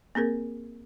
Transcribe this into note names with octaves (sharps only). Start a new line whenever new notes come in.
A#3 C4 G#4 A#4